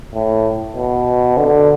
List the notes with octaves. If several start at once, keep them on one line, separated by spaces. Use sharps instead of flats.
A2
B2
D3